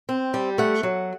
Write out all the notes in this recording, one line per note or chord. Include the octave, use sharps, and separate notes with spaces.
C4
G3
A3 F#5
F#3